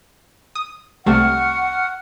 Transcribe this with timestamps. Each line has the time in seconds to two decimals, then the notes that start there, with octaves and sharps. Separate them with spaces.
0.55 D#6
1.06 C2 C3 A3 F#5 C#6 F6